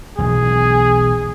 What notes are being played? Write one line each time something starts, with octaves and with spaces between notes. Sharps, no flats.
E1 B1 E2 G#4